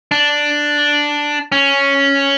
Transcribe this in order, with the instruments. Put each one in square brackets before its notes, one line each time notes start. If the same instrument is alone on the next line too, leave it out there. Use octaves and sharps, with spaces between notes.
[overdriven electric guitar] D4
C#4